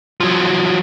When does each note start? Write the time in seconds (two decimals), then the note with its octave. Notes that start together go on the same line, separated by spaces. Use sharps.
0.20 F3 F#3